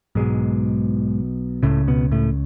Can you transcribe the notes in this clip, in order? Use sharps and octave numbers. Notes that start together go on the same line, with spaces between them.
B1 G#2 B2 G#3
C#2 A2 C#3 A3
B2 B3
A2 A3